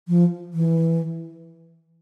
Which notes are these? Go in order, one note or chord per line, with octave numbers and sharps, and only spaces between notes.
F3
E3